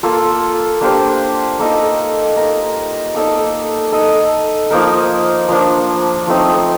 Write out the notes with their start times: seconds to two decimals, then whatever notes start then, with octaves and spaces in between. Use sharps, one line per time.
0.03 A#3 F4 A4
0.81 A#3 D4 G4 C5
1.59 A#3 D#4 A4 D#5
2.36 A#3 D#4 A#4
3.14 A#3 D#4 A4 D5
3.92 D#4 A4 D#5
4.70 F3 A#3 D#4 A#4
5.48 F3 A#3 D4
6.27 F3 A3 C4 D#4